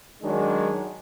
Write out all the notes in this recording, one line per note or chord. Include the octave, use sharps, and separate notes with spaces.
D#3 F#3 G#3 D4